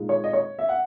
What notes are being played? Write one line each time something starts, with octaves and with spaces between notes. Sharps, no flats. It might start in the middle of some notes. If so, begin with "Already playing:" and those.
Already playing: A#2 G#3 D#4
C#5
D#5
C#5
E5
F#5